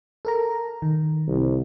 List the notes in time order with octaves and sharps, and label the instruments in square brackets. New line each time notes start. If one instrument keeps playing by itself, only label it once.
[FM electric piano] A4 A#4 A#5
D#3
[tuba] C2